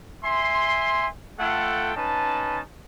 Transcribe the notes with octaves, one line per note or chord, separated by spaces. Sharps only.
E5 G#5 C6
A3 F4 A4 F#5 G5
C#4 D#4 B4 A5